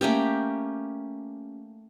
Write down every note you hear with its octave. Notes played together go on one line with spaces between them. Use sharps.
A3 A#3 C#4 G4